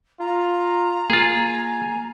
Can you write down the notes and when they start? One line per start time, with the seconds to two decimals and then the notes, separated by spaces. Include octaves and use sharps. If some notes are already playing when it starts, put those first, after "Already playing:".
0.20 F4 A#5
1.10 A#3 F4 G#4 G#5